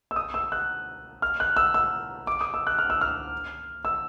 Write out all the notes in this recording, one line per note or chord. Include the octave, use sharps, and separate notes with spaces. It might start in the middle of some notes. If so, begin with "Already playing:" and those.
E6
D#6
E6
F#6
F6
F#6
E6
E6
D6
D#6
E6
F#6
F6
E6
F6
E6